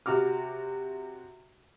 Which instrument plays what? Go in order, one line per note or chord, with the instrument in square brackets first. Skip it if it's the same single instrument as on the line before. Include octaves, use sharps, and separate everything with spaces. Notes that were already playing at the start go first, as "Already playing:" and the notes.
[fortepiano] C3 F#4 D6 F6